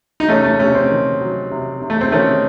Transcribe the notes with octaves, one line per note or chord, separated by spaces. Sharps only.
D#4
C3 A3 C#4
A3
C3 A3 C#4
C4
D#3
F#3
C3
C3
A3
C4
D#3 A3 C#4